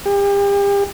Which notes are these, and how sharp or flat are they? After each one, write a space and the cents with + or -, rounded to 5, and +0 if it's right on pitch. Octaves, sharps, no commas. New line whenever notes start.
G4 +40